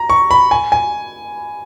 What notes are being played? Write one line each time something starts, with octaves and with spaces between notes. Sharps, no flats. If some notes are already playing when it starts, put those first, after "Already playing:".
Already playing: A#5
C#6
B5
G#5
G#5